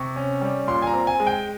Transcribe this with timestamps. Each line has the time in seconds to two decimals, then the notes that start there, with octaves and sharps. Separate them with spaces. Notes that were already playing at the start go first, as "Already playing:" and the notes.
Already playing: C3 C#6
0.16 C#4
0.41 G3
0.68 A#2 C6
0.82 G#5
0.87 A#5
0.93 C4
1.07 G#5
1.20 G#3
1.27 G5